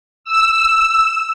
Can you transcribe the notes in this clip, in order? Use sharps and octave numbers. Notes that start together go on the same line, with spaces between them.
E6